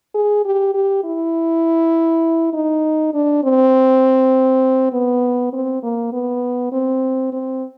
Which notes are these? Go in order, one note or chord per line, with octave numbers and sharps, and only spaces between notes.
G#4
G4
G4
E4
D#4
D4
C4
B3
C4
A#3
B3
C4
C4